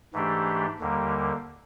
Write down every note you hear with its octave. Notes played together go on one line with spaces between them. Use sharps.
G#2 E3 A3 D4 G4
D#2 D3 G3 A#3